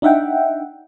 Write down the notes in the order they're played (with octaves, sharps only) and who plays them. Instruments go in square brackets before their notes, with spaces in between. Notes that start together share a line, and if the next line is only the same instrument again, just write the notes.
[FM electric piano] D4 D#4 E5 F#5 G5